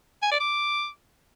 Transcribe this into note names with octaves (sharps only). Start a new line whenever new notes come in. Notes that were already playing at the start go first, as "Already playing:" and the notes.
G#5
D5
D6